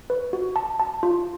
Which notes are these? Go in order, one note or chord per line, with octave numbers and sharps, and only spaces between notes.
B4
F#4
A5
A5
F4